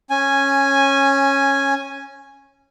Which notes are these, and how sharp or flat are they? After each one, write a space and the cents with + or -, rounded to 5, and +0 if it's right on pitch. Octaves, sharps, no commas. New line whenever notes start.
C#4 -15 G#5 +0